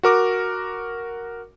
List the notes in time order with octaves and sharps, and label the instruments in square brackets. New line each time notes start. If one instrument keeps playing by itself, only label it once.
[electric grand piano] F#4 A#4 D6